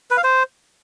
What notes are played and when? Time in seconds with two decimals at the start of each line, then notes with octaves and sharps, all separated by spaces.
0.11 B4
0.17 F5
0.24 C5